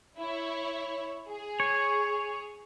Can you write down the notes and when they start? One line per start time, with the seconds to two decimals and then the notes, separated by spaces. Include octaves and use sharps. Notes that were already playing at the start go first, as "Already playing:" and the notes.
0.17 E4 C#5
1.29 G#4
1.60 C#5